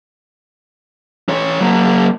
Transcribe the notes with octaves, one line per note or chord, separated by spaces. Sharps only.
E3 C#5
F#3 A#3